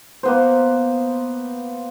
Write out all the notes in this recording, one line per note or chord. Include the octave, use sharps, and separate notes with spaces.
A#3 B3 C5